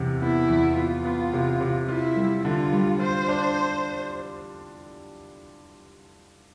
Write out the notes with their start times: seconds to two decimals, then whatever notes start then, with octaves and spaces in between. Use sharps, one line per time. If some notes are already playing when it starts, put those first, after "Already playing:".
Already playing: E2 C3
0.22 B3 E4
0.49 E2
0.77 B3 F4
1.05 B3
1.33 C3
1.61 C3
1.88 E4 F4
2.16 G3
2.45 D3 F4
2.72 G3
3.00 F4 C5
3.28 D4